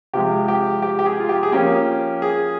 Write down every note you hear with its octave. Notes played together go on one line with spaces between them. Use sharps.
C3 F3 G#3 G4
G4
G4
G4
G#4
F4
G4
G#4
F3 A#3 C#4 G4
G#4